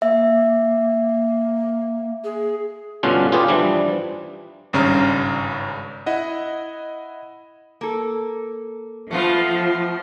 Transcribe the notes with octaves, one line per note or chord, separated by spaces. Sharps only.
A#3 E5
G#4
G2 B2 D3 C#4 D4 F4
F4 G4 G#4 B4 D5
E3 F3 G3 D4
G#1 G2 C#3 C#4 A#5 F6
E4 D#5 F#5
A#3 A4
F3 A3 B3 F4